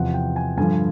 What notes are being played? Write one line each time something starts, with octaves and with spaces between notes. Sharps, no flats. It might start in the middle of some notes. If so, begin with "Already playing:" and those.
Already playing: E2 C3 F3 F#5
G5
G#5
G2 D3 F3 G#5